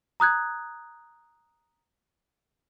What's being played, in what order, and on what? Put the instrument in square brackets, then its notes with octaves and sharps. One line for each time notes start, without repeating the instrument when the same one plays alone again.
[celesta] A#5 D#6 F#6 G#6